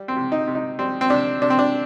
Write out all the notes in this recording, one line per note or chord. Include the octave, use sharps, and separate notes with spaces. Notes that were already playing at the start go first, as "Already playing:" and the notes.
Already playing: G3
C4
C3
D#4
C3
D#4
G3 C4
C4
C3 D4
C3 D4
C4
D4